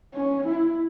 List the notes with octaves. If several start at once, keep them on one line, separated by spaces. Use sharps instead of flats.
C#4
E4